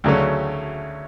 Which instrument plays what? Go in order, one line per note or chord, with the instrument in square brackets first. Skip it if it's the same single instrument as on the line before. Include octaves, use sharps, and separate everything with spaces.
[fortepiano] D2 C#3 F#3 A3 C#4